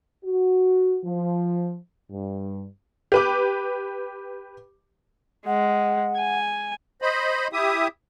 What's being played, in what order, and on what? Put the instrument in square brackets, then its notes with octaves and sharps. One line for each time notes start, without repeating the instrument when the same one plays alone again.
[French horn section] F#4
F3
G2
[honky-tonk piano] G4 B4 D6
[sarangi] G#3 [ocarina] F#5
[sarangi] G#5
[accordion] C5 D#5 B5
E4 G4 E5 D#6